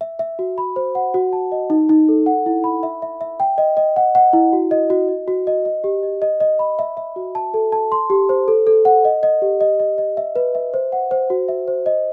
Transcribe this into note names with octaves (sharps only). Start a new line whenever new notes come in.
E5
E5
F#4
B5
C5
F#5
F#4
A5
D#5
D#4
D#4
A4
F#5
E4
B5
E5
E5
E5
G5
D#5
D#5
F#5
F#5
E4
F#4
D#5
F#4
D#5
F#4
D#5
D#5
G4
D#5
D#5
D#5
B5
E5
E5
F#4
A5
A4
A5
C6
G4
C5
A4
A4
F#5
D#5
D#5
G4
D#5
D#5
D#5
E5
B4
E5
C5
F#5
C5
F#4
E5
C5
D#5